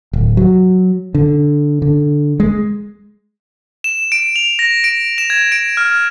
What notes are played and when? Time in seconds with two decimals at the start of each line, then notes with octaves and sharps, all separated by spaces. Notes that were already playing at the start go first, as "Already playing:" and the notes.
0.13 D1
0.37 F#3
1.15 D3
1.82 D3
2.40 G#3
3.84 E7
4.12 D7
4.36 F7
4.59 A#6
4.84 D7
5.18 E7
5.30 G#6
5.52 D7
5.77 F6